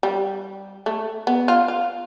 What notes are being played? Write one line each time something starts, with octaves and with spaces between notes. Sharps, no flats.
G3
A3
B3
F4
F4